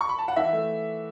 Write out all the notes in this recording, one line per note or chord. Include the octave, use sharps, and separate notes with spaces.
C#6
B5
A5
F#5
E3 E5
A3